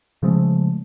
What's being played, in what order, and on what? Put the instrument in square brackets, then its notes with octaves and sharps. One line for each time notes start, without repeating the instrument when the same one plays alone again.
[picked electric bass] C#3 F3 G#3 A3